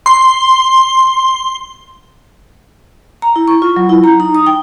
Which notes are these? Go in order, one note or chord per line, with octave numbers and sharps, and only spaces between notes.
C6
A#5
E4
C#6
F4
F#3
E4
A#5
D#4
D#6
G5